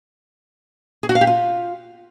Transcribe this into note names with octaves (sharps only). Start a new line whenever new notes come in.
G#4
F#4
F5
G4
F4